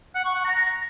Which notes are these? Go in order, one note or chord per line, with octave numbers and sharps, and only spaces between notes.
F#5
C#6
F#5
A#5